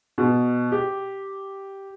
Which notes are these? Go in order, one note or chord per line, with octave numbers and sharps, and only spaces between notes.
B2
G4